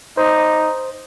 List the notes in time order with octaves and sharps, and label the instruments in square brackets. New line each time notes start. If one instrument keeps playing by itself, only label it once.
[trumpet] D#4 [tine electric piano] C5